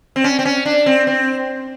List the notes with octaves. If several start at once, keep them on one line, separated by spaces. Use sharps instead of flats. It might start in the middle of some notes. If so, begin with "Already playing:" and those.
C4
C#4
C4
C#4
D4
C4
C4